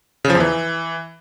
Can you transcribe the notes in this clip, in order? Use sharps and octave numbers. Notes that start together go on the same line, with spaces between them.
C#3
F3
E2
E3